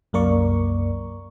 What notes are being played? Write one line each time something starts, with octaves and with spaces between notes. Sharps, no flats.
C2 F#2 A#3 A#4 D5 C#6